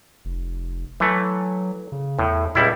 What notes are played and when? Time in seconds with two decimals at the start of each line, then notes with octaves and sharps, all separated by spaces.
0.25 F1
1.00 E3 F#3 A3
1.92 C#3
2.19 E2 A2
2.55 C#2 A#2 G3 E4